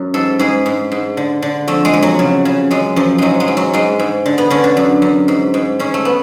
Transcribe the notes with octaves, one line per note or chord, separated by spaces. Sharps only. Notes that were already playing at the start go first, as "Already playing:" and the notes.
Already playing: F#2
G#2 A4
G#2 G#4
G#2
G#2
D3
D3
F2 A3
G#3
F2
F#3
C#3
C#3
F#2 G#3
F#2 F3
G#2 F#3 G#3
G#3
G#2
F#3
G#2 G#3
G#2
D3
B3
D3 C#4
D4
F#2
F#2
G#2
G#2
G#2 C#4
A3
B3